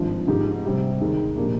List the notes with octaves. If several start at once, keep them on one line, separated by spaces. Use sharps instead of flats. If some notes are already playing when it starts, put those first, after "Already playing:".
Already playing: G#1 G2 F3
G#2 D#3 G#3 D#4 G4
C3 G3 C4
D#2 D#3 G#3
A#2 F3 A#3 D4 G4